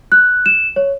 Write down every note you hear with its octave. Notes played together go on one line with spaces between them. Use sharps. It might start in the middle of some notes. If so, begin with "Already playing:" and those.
F#6
E7
C#5